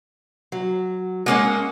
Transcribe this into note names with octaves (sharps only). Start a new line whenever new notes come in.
F#3
G#3 A#3 C#4 F#5